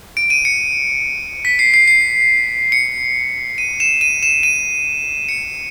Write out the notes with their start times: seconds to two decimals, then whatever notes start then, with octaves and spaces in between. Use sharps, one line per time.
0.17 D7
0.30 D#7
0.45 C#7
1.45 B6
1.59 C7
1.74 C7
1.88 C7
2.72 C#7
3.58 D#7
3.80 E7
4.01 D#7
4.23 E7
4.43 D#7
5.29 C#7